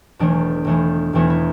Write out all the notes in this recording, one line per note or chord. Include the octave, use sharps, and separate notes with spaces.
E1 E2 E3 A3 D4
E1 E2 E3 A3
E1 E2 E3 A3 E4
E4